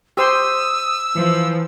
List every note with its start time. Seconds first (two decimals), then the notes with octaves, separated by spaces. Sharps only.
0.17 G4 C5 C6 D#6 E6
1.15 E3 F3